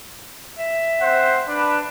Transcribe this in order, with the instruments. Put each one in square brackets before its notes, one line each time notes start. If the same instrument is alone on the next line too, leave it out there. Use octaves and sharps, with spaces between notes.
[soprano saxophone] E5
[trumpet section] C4 C5 F#5
D4 B4